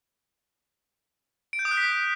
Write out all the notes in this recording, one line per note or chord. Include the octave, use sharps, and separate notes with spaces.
D7
G6
D#6
F#6
B6